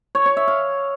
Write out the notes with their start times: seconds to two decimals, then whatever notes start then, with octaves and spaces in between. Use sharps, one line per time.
0.15 C#5
0.26 C#5
0.37 E5
0.48 F5